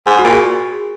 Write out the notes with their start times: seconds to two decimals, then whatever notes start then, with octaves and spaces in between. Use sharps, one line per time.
0.06 G#2 G#4
0.19 F#4
0.24 A#2
0.32 G#4